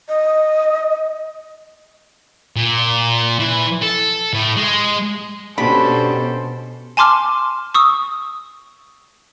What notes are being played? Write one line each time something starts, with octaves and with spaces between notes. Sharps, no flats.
D#5
A#2
E3
A4
A2
G#3
B2 C#4 D4 G4 A4 C5 B5
G#5 A5 C6 D6 F6
C#6 D#6 E6